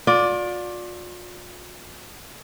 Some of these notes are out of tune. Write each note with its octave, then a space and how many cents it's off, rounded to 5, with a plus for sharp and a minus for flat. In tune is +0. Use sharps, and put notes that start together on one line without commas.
F4 +40 D5 +0